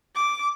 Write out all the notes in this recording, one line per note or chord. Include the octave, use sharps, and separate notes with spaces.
D6